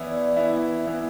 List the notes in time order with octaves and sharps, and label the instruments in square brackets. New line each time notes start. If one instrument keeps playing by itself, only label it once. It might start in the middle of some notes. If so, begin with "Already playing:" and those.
Already playing: [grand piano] E3 B3 E4 [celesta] C#5 D5 E5
[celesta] D5
D5
[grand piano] E3 B3 E4 [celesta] E5
[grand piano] E3 B3 E4